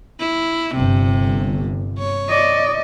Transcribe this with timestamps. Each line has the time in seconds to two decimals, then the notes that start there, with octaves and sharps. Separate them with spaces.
0.19 E4
0.75 G1 C3
1.98 C#5
2.29 D5 D#5